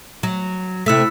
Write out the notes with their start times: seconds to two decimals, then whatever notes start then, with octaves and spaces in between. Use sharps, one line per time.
0.23 F#3
0.86 C3 A3 E4 E6 B6